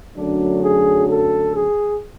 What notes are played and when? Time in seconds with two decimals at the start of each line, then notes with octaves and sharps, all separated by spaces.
0.16 F#2 D3 F#3 A3 D4
0.63 G#4
1.09 A4
1.56 G#4